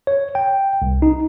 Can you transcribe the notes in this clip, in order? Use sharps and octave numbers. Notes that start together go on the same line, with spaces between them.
C#5
G5
C2
D#4